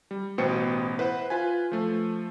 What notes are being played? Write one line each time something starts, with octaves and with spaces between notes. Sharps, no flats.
G3
A1 B2 B3 C5 G5 C#7
E4 B4 C5 F#5
F4 B4 G#5
F3 A3